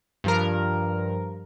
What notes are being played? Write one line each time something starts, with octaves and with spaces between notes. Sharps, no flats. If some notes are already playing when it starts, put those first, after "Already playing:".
G2 F3 A#4